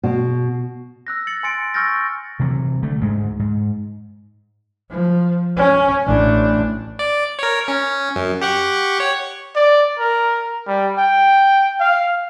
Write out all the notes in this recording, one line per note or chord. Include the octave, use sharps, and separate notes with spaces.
B2
E6 F#6 A#6
A6 C#7 F#7
G#5 C6 A6 C#7 D7
C#6 E6 F6 G6 A6 A#6
C3 E3 F#3
D3 A3
D2 G#2 G#3
G#2
F3
C#4
A1 D4
D5
A#4 C#5
C#4
F#2
G4 F#5 C#6
C#5
D5
A#4
G3
G5
F5